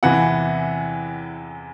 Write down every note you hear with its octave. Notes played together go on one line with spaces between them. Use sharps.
E2 C3 E3 F#5